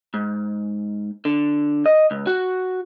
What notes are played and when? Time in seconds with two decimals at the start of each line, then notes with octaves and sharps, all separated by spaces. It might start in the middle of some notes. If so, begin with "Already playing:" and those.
0.14 G#2
1.25 D3
1.86 D#5
2.11 C#2
2.27 F#4